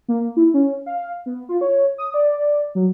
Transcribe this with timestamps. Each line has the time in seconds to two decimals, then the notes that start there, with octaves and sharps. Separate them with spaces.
0.08 A#3
0.37 E4
0.54 C#4
0.86 F5
1.26 B3
1.49 F4
1.61 C#5
1.98 D#6
2.14 D5
2.75 F#3